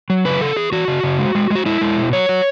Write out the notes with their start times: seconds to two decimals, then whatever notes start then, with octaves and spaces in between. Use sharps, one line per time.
0.10 F#3
0.25 C#3 B4
0.41 C#3 A4
0.56 E3 G#4
0.72 E3 F#4
0.88 C#3
1.03 C#3
1.19 G#3
1.35 G#3
1.50 G#3
1.55 F#4
1.66 G#3 E4
1.81 G#3
1.97 B2
2.13 F#3 C#5
2.29 F#3